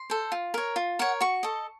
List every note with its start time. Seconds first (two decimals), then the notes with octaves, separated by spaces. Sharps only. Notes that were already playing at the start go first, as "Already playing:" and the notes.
Already playing: C6
0.10 A4 C5
0.32 F4
0.54 A#4 C#5
0.76 F4
0.99 A#4 C#5 F#5
1.21 F#4 C#6
1.43 A4 D#5